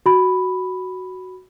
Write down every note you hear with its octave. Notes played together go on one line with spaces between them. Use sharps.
F#4 B5